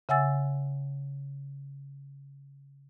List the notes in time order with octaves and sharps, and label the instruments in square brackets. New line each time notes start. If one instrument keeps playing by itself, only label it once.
[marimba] C#3 E5 F#5 G#5 E6 A6